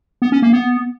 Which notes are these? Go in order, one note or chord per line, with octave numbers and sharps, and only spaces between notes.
B3
C#4
A#3
B3